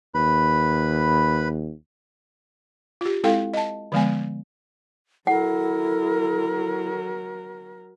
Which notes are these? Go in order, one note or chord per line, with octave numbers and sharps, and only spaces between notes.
D#2 B4 B5
F4 G4
G#3 C4 E4 A4 F5 G5
D#5 A5
D3 F3 G#3 B3 G#5
F#3 E4 A4 A#4 F#5